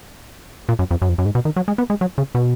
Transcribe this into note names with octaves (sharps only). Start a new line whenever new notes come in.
A#2
F#2
F2
F#2
F2
F#2
G#2
B2
D#3
F#3
G#3
B3
G#3
F#3
C#3
B2